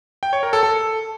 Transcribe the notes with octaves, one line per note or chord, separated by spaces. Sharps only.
G5
C#5
A#4
A4
A4